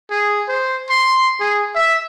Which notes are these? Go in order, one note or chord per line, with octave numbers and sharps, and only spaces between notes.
G#4
C5
C6
G#4
E5